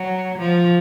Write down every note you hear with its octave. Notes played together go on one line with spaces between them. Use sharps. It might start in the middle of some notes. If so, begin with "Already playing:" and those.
Already playing: F#3
F3